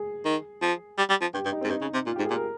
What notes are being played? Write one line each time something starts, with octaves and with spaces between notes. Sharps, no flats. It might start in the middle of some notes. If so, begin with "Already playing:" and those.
Already playing: G#4
D#3
F3
G3
G3
F3
G2 G4
G2
D#4
C4
G#2
G2 D#4
C#3
C3
A#2 F4
G4
G#2
G#4
A#2
A#4